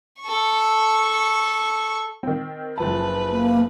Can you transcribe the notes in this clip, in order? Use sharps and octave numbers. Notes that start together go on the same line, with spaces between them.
A4 C#6
D#3 C4
F#1 F3 B4 A5
A#3